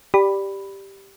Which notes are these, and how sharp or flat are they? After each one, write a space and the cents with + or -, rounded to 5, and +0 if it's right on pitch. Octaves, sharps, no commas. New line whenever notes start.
G4 +0 D5 +0 B5 +0